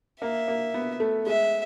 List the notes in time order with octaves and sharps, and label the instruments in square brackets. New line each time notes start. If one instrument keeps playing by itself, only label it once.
[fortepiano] A#3 [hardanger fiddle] E5
[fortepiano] A#3
B3
A3
[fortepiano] G#3 [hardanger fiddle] E5